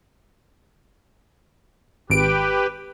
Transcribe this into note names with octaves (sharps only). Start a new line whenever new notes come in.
G#1 G4 B4 D7